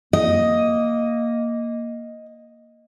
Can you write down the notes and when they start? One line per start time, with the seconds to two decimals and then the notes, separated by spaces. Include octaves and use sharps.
0.13 A#3 D#5